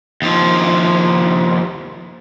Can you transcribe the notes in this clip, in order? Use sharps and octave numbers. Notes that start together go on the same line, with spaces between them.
D#2 F3